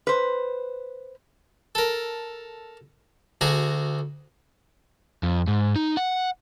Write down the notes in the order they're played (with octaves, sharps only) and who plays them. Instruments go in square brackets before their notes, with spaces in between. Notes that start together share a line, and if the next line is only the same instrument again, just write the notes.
[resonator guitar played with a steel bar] B4 C5
[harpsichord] A4 A#4
D2 F#4 G#4 A#5
[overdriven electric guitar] F2
G#2
D#4
F#5